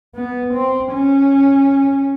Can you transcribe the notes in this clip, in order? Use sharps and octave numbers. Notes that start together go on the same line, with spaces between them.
B3
C4
C#4